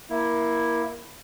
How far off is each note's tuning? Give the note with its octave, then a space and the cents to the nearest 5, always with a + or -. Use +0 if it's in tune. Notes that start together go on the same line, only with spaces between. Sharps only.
A#3 +20 E4 +0